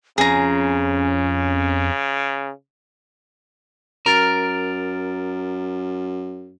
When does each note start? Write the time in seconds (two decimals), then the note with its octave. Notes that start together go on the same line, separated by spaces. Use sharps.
0.18 F2 C#3 C#4 G#4 A#5
4.06 F#2 A#4 F6 A6 D7